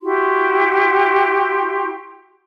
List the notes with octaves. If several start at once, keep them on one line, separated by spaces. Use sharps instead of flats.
E4 F#4 G4 C6